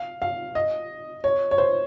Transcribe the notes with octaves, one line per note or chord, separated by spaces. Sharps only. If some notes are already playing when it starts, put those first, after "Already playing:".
Already playing: F5
F5
D#5
C#5
C#5
C5